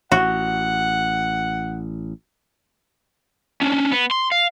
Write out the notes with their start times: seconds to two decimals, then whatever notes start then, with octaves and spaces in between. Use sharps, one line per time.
0.12 A1 F#4 F#5
3.62 C#4 D4
3.92 B3
4.11 C6
4.32 F5